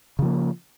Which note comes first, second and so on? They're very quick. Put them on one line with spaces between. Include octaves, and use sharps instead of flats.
C#3 F3 A#3